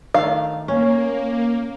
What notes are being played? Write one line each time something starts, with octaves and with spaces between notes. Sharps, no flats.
D#3 A3 F5
A#3 C#4